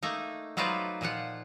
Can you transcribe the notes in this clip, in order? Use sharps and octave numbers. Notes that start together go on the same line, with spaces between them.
A3 A#3 D#4
F#3 D#4 F4 B4 C5 D5
A#2 F3 F4 F#5